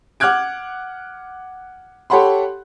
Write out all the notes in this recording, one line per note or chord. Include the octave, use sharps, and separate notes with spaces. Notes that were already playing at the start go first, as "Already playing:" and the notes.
F#5 D6 F6 F#6 G#6 D7
G4 A4 C#5 F#5 B5 C6